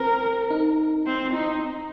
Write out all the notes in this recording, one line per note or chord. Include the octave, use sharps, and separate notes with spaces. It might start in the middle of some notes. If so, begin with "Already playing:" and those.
Already playing: C4 A#4
D#4
C4
D#4